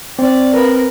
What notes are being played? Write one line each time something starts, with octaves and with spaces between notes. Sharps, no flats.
C4 D5
A#4 B4